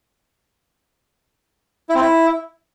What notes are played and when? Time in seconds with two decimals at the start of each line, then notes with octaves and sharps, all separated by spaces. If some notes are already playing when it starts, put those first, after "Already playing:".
1.89 E4
1.95 C4
2.01 E4